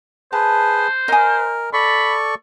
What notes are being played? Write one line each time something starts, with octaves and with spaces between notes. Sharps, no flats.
G#4 B4 C5 A5
A#4 D#5 G#5 D#6 F6
A4 D5 B5 C#6